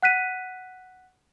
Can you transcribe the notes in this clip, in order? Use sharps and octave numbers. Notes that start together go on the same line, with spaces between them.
F#5 F#6 B6 D#7